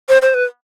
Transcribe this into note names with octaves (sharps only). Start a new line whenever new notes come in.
C5
C5
B4